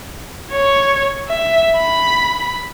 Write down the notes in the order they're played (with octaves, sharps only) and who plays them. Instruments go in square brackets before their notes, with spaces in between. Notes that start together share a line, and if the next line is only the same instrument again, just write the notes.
[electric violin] C#5
E5
B5